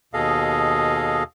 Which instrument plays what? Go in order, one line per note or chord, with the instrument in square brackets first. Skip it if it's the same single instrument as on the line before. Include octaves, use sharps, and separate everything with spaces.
[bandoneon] D#2 B2 G#4 A4 D#5 F5